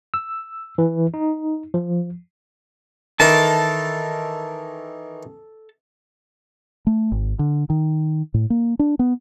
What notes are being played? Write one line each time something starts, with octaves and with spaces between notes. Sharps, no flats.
E6
E3
D#4
F3
D#3 E3 A4 A#4 A5
A3
G#1
D3
D#3
A2
A#3
D4
B3